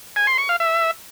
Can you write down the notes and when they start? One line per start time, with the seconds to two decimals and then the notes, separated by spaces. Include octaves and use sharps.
0.16 G#5
0.27 C6
0.38 C#6
0.49 F5
0.60 E5